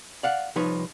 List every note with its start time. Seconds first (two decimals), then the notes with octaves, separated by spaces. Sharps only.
0.23 D5 F5 F#5
0.56 C2 F3 D#4 B4 C#5